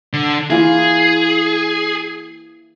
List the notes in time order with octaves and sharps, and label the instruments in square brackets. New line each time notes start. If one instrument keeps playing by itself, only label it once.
[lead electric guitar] D3
[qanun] E3 A#3 F4 [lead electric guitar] G#4